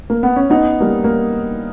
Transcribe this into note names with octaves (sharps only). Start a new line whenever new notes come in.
A#3
B3
C#4
B3 D#4
G3 A#3
A#3